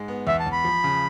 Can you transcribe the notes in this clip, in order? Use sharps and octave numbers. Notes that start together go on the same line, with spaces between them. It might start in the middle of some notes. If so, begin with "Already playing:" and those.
Already playing: G#2 G#3
B3
E2 E5
A5
E2
B5
F3
C#3